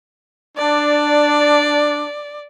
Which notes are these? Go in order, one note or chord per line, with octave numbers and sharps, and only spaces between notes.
D4 D5